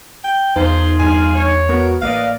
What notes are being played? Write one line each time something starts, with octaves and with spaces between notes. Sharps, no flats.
G5
E2 D#4 F4 G#4 C5
G2 D#4 G#5 F6
C#5
B3 F#4 A#4
A1 A#3 A#4 B4 D5 D#5 F5